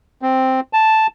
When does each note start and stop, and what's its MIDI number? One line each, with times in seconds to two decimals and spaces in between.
0.22 0.60 60
0.73 1.07 81